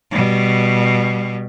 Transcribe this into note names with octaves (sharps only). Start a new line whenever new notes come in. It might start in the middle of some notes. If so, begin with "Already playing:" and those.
B2 G3